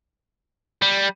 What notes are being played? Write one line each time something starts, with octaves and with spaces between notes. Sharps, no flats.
G3